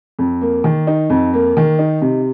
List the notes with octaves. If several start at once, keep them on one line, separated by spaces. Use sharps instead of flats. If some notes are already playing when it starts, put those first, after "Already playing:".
F2
A#3
D#3
D#4
F2
A#3
D#3
D#4
C3